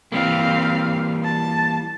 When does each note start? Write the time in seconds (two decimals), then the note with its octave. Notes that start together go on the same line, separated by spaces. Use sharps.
0.12 E3 G3 A#3 C4 F5
1.24 A5